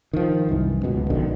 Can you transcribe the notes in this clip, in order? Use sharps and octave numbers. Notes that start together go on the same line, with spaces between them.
D#3 F3
C2 F#2 E3
D1 C#2 B2
A#1 B2 D3 D#3